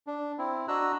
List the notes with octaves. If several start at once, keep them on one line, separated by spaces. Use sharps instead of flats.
D4
C4 E4
D4 F#4 D#5 A#5 E6 F#6